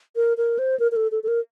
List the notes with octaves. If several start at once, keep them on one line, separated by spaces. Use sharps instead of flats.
A#4
A#4
C5
A#4
A#4
A4
A4
A4
A#4